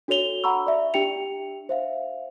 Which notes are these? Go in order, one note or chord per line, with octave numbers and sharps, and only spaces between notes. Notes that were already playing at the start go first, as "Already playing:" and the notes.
D4 F#4 A4 C#5 F7 G7
F#5 A#5 B5 C#6 E6
D5 E5
D4 G4 G5 C#7 F7
C5 E5 F5